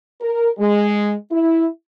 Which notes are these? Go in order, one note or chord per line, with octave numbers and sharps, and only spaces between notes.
A#4
G#3
E4